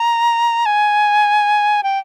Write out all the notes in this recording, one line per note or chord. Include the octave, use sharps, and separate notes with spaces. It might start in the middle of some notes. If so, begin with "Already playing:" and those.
Already playing: A#5
G#5
G5